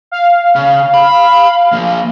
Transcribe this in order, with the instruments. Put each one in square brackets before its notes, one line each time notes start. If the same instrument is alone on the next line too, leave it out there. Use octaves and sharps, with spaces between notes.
[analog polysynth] F5
[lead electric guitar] C#3
B5
F3 A#3